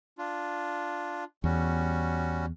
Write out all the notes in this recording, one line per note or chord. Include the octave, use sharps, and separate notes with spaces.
D4 F4
E2 G3 C#4 F#4